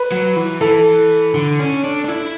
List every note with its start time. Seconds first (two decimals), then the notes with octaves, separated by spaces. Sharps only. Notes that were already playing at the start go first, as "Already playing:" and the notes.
Already playing: B4
0.12 F#3
0.36 E3
0.61 E3 A4
1.35 D3
1.59 C#4
1.84 D4
2.05 D4
2.08 E4